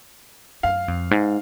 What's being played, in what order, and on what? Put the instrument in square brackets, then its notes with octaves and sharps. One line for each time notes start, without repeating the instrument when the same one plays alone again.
[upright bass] F#2 [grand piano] F5
[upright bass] F2
G#2